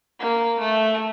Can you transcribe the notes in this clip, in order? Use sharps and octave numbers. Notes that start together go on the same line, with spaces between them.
A#3
A3